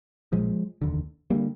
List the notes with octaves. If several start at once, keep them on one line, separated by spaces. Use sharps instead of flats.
A#1 A#2 F3 G#3
F1 D#2 D3
D3 G3 A#3